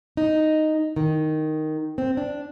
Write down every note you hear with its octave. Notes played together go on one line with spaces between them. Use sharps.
D#4
D#3
C4
D4